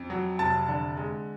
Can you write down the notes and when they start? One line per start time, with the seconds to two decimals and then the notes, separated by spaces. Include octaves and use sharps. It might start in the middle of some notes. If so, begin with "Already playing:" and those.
Already playing: F2
0.10 F#3
0.39 F1 A5 A6
0.68 D3
0.97 G#3